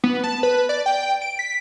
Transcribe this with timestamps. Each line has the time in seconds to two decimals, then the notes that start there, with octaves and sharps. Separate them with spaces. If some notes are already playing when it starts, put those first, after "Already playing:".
0.04 B3
0.24 A5
0.43 B4
0.69 D5
0.86 G5
1.22 D7
1.39 B6